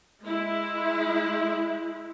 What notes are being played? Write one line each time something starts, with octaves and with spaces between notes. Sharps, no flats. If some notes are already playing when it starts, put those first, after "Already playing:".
G#3 E4